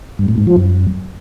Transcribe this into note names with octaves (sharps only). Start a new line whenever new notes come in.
G2
A2
G#2
F3
F#2